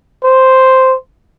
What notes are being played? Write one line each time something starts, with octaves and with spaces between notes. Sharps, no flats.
C5